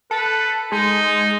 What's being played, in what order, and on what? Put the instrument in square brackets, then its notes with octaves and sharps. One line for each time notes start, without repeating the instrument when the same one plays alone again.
[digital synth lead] A4 [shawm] B4
[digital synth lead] G#3 [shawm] D#4